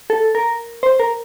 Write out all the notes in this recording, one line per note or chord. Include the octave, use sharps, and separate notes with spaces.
A4
A#4
C5
A#4